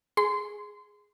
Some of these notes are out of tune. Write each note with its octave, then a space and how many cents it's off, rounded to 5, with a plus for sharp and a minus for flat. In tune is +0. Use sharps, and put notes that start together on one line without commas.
G#4 +0 C6 -25